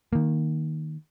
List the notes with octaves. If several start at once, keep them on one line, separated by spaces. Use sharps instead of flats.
D#3 A#3